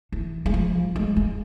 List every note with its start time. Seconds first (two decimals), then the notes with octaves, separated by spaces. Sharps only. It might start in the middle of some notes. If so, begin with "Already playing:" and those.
0.12 E3
0.46 G#3
0.54 F3
0.96 G#3
1.16 G#3